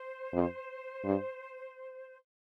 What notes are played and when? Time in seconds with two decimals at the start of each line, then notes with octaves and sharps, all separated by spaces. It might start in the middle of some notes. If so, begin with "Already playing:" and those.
Already playing: C5
0.33 F2
1.05 G2